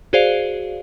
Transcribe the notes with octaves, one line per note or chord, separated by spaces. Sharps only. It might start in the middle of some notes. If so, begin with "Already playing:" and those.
F#4 G#4 C5 D5 F5